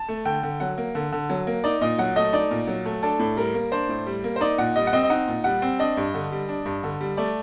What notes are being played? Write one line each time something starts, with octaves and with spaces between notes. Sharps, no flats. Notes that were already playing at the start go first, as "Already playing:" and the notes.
Already playing: A5
A3
D3 G5
D3
F#3 F#5
A#3
D3
D3
F#3
A#3
D#4 D5
A#2 D#5
F#3 F#5
A3 D#5
D#4 D5
A#2
F#3
A3
D4 A4
A2
G3 A#4
A#3
D4 C5
A2
G3
A#3
C5
D#4 D5
A#2 F#5
G3 D#5
F#5
C4 D#5
D#5
D#4 F#5
A#2
G3 F#5
C4
D4 D#5
G2
D3
G3
D4
G2
D3
G3
A3 D5